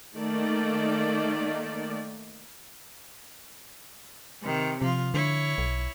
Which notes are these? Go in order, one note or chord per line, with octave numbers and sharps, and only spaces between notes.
D#3 A3 A#3 D#4 D5
C3 D#3
C3 F3 F4
D3 E4 C#5
B1